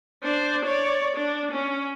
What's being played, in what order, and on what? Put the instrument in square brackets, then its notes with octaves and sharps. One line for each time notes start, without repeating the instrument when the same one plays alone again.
[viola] D4 C5
C#5 D5
D4
C#4